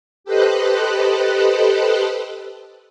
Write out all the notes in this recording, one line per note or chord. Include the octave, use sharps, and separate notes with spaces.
G4 A4 B4 C5 D#5 F#6